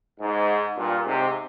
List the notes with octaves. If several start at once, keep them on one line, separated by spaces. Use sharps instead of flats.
G#2
G2 A#2
G#2 C3